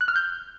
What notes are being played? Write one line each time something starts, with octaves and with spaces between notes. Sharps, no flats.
F#6
F6
G6